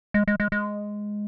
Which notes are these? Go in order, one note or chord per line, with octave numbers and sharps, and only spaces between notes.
G#3
G#3
G#3
G#3